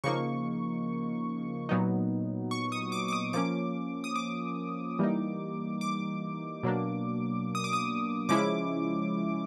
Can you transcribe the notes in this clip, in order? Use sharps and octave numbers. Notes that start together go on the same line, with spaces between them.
C#3 F3 A#3 D#4 C#6
A#2 F#3 B3 D#4
C#6
D#6
D6
D6
D#6
F3 A#3 C#4 D6
D#6
D6
E3 G3 A#3 D#4
D6
B2 F#3 A#3 D4
D#6
D6
D#6
C#3 F3 G#3 C#4 E4 D6